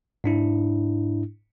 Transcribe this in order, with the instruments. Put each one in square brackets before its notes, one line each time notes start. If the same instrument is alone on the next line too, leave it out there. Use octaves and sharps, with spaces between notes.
[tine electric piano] G#2 D4 E4